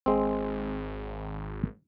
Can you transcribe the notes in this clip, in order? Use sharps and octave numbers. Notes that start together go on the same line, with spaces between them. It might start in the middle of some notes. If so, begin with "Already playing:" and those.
G#1 G#3 C4